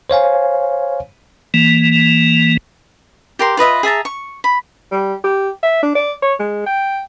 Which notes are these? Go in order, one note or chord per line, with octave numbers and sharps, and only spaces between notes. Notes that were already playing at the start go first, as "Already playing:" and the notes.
C5 C#5 F5 G#5
E3 A#3
G4 A#4 C6
F4 B4 D#5 E5
G#4 E5 A5 A#5
C#6
B5
G3
G4
E5
D4
D5
C#5
G#3
G5